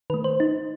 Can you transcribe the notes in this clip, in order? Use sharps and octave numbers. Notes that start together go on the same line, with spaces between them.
D#3 A3 B4
C5
D#4